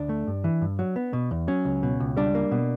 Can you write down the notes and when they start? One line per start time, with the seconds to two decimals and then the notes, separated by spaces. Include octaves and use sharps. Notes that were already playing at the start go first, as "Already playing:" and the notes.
Already playing: D2 D4
0.09 A3
0.27 G2
0.44 E3
0.61 G2
0.79 F#3
0.96 B3
1.13 B2
1.31 E2
1.48 F#3 C#4
1.65 C#2
1.83 B2
2.00 C#2
2.17 G3 D4
2.35 A#3
2.51 B2